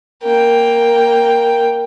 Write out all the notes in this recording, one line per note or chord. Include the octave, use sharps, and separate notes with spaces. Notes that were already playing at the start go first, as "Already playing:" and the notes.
A#3 G5